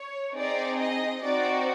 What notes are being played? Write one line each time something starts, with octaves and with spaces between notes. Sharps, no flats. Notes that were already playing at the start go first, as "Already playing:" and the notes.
Already playing: C#5
C4 D#4 G#4 D5
D#5
C4 D#4 F#4 D5